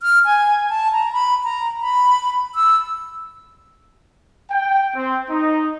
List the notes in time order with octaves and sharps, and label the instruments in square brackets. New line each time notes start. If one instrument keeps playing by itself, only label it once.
[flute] F6
G#5
A5
A#5
B5
A#5
B5
E6
[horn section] G5
C4
D#4